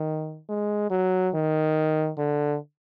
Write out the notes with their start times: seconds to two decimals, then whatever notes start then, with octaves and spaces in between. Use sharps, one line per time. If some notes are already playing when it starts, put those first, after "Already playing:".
Already playing: D#3
0.49 G#3
0.91 F#3
1.34 D#3
2.18 D3